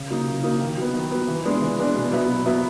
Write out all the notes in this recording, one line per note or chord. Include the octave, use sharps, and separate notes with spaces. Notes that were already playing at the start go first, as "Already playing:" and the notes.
Already playing: C#3
F#3 A#3 D#4
C#3
F#3 A#3 D#4
D#3
F#3 B3
D#3
F#3 B3
E3
G#3 B3 D4
E3
G#3 B3 D4
B2
F#3 B3 E4
B2
F#3 B3 E4